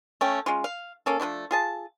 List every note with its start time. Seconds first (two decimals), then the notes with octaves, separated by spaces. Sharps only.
0.21 A3 C#4 G5
0.46 G#3 C#4 F4
0.64 F5
1.06 A#3 C#4 A4
1.20 F3 F#3 A3 D4
1.51 F4 G#4 A5